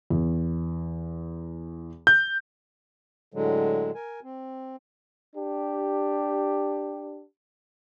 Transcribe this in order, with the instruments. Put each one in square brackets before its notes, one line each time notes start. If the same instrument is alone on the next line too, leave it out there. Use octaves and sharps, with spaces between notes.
[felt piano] E2
[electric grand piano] G6
[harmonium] A2 D3 F#3 G#3
A#4 G#5
C4
[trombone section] D4 G4